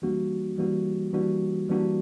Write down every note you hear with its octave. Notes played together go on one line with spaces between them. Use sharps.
E3 G3 A#3 D4 F#4
E3 G3 A#3 D4 F#4
E3 G3 A#3 D4 F#4
E3 G3 A#3 D4 F#4